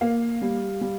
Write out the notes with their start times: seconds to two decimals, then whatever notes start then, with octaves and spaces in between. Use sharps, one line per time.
0.01 A#3 F5
0.42 G3
0.81 G3